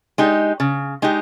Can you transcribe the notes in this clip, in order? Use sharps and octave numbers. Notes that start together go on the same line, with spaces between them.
G#3 D#4 G4
C#3
G#3 D#4 G4